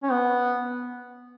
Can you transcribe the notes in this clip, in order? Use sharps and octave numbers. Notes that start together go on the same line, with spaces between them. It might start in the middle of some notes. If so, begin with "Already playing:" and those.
C#4
B3